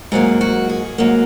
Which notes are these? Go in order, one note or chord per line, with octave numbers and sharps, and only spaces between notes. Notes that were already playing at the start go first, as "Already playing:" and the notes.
G#2 F#3 A#3 G#4
F#4
G#4
G#2 F#3 A#3